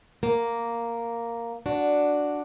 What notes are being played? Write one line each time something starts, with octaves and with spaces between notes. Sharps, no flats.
A#3
D4 F#4